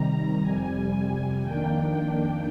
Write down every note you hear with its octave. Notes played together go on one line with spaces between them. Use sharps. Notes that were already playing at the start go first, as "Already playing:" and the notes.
Already playing: C3 D#3 G3 A#5
F2 C3 G3 G#5
F2 D#3 A#3 D4 G5